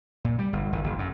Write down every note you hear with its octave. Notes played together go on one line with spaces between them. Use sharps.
A#2
G3
G1
G#1
F#1
F#2